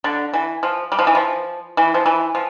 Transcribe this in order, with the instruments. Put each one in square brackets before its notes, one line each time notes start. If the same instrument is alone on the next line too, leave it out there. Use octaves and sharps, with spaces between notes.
[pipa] D3
E3
F3
G3
F3
E3
F3
E3
F3
E3
F3